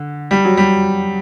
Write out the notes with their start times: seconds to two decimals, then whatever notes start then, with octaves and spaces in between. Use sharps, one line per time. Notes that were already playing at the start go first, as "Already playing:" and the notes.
Already playing: D3
0.31 G3
0.44 F#3
0.57 G3